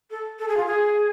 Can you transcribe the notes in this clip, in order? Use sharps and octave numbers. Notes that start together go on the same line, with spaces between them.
A4
A4
G#4
F4
G#4